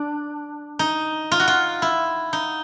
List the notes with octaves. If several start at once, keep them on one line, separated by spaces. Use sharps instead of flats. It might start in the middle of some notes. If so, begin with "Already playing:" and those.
Already playing: D4
D#4
F4
F#4
F4
E4
D#4